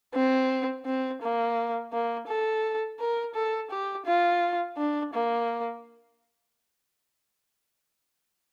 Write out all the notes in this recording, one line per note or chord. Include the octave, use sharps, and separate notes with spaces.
C4
C4
A#3
A#3
A4
A#4
A4
G4
F4
D4
A#3